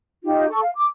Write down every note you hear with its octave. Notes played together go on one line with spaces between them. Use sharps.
D#4 F4 G4
A4 C#6
F5
D6